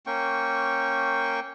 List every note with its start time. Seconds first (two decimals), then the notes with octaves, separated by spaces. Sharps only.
0.06 A#3 C#4 G5 C#6